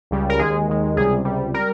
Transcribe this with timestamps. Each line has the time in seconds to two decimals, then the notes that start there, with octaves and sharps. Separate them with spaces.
0.11 C#2 C#3 G3
0.30 A#4
0.39 D#2 D#3 G#3 G#4
0.68 D#2 D#3 G#3
0.97 C#2 C3 G3 G#4
1.25 C#2 C3 G3
1.54 G3 A#4